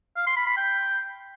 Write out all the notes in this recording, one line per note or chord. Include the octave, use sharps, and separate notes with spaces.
F5
C6
B5
B5
G5